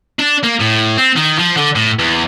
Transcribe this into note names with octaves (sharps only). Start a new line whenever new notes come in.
D4
A#3
A2
C4
D#3
F3
D3
A2
E2